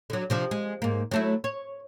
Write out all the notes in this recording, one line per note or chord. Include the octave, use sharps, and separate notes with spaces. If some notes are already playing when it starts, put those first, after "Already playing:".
D3 F#3
C3 F3 D4
G#3
G#2 A#3
F#3 A3 E4
C#5